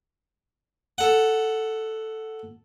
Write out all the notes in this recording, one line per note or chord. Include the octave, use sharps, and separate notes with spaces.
A4 F#5